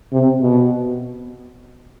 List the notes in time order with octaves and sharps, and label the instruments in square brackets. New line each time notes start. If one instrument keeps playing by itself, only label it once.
[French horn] C3
B2